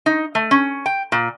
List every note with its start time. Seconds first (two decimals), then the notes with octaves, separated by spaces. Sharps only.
0.06 D#4
0.35 A3
0.51 C#4
0.86 G5
1.12 A#2